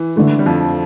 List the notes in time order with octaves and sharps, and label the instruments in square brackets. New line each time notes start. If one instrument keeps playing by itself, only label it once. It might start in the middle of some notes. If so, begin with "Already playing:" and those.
Already playing: [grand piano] E3
[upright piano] D3 A3 E4
[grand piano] G3
F2 F3